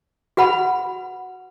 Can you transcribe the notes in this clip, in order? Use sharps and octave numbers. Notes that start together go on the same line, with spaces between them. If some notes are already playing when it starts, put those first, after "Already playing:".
F#4 B4 F#5 B5